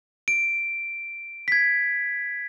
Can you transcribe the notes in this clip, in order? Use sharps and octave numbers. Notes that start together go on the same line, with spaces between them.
D7
G#6 B6